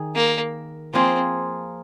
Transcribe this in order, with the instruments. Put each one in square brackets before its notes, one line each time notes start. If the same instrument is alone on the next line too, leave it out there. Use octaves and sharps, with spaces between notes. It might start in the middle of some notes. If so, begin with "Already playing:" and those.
Already playing: [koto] D#3 G#4
[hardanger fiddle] A#3
[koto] F3 A#3 F4 G#4 [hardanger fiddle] C4